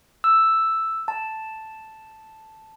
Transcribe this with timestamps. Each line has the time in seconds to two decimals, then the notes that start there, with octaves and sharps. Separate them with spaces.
0.24 E6
1.08 A5